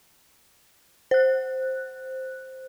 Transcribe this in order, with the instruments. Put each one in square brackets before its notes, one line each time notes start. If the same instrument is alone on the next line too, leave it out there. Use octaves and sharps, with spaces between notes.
[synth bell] C5 F#6